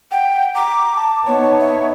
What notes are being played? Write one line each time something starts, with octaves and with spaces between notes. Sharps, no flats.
F#5 G5
A#5 D6
A5
B3 D#4 C#5
E5